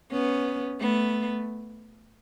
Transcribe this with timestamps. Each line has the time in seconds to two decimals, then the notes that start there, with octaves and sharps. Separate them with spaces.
0.12 B3 C#4
0.80 A3 B3